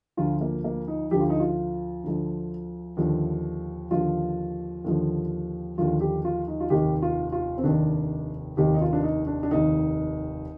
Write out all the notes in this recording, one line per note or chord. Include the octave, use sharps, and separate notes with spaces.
D2 D3 F3 F4
A#3
A#3
D#4
D2 D3 F3 G4
F4
D#4
F4
D2 D3 F3
D#2 D3 F3
D#2 D3 F3 F4
D#2 D3 F3
D#2 D3 F3 F4
G4
F4
D#4
F4
F1 D#2 D#3 G4
F4
F4
C4
F1 D#2 D#3 D4
F1 D#2 D#3 G4
D#4
F4
D4
D#4
D4
D4
F1 D#2 D#3 D#4